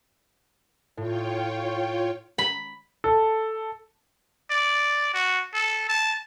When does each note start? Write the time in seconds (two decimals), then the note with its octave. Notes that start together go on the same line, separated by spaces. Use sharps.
0.97 A2 F4 C#5 G5
2.38 B5
3.04 A4
4.50 D5
5.14 F#4
5.54 A4
5.89 A5